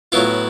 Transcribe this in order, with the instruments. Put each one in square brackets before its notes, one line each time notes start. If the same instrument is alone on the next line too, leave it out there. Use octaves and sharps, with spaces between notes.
[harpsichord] A2 F#3 B3 E4 F4